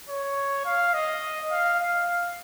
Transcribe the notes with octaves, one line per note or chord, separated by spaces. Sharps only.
C#5
F5
D#5
F5
F5